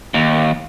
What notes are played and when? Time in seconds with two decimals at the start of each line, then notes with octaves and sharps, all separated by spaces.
0.14 D#2